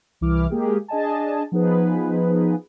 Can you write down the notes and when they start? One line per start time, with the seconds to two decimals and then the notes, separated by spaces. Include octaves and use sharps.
0.21 C2 E3 E4 D6 F6
0.50 G#3 A#3 G4 G#4
0.88 D4 G#4 D#5 G#5 A5
1.52 F3 B3 D#4 G#4 B4